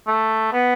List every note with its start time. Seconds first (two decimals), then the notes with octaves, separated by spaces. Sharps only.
0.07 A3
0.53 B3